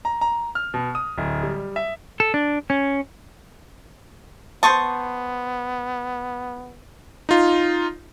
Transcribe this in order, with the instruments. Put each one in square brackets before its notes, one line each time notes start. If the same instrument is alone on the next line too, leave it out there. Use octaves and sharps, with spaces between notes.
[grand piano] A#5
A#5
F6
B2
D#6
D1
G3
E5
[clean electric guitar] A4
D4
C#4
[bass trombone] B3 [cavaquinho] C5 C#6 D#6 [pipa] A5
[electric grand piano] D#4 F4